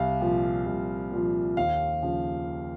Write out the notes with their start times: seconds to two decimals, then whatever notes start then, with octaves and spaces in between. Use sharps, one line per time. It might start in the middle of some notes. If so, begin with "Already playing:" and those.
Already playing: C2 F5
0.21 A#2 F3
0.66 C2
1.11 A#2 F3
1.57 D#2 F5
2.03 C#3 F3